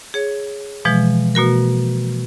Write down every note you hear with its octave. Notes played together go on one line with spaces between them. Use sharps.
G#4 C#5
B2 E3 F3 G#3
B2 A#3 F#4 A#4